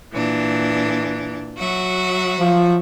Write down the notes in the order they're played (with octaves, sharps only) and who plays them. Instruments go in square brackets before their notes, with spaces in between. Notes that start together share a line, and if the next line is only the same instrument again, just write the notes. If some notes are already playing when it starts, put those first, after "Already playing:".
[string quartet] A#2 E3 D4
F#3 F#4 E5
[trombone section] F3